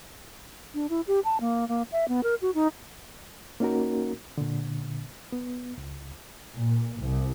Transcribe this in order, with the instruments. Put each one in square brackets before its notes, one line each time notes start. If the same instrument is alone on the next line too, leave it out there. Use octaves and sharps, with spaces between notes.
[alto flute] D4
E4
G4
A5
A#3
A#3
E5
B3
A#4
F#4
D#4
[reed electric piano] A#3 C#4 D#4 F#4 A#4
A#2 D3
B3
C#2
[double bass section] A#2
C2